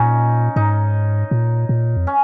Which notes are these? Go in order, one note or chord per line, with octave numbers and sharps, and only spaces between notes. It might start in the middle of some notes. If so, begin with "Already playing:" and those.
Already playing: A#2 C#4 D#4
G#2 D#4
A#2
A#2
F2
C#4